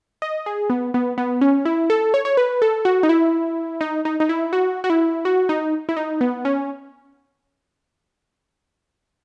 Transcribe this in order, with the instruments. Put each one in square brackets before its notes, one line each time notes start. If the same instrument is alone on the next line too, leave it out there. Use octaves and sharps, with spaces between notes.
[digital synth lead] D#5
G#4
B3
B3
B3
C#4
E4
A4
C#5
C#5
B4
A4
F#4
D#4
E4
D#4
D#4
D#4
E4
F#4
F#4
E4
F#4
D#4
E4
D#4
B3
C#4